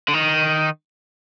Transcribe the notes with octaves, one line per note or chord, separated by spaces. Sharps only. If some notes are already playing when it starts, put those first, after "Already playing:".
D3
D#3